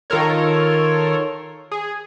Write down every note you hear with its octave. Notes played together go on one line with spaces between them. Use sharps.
D#3 F4 A4 A#4 C#5
G#4